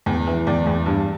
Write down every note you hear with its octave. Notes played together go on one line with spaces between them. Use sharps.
E2
E3
E2 D5
E2
G2